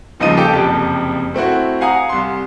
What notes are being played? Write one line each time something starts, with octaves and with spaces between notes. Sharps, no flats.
D#1 C#2 F3 D#4 D#5 D#7
G4 A4 G5 D6
F#1 F2 C3 A5
A3 C4 E4 F#4
F5 F#5 G#5 A#5 D#6
C2 C6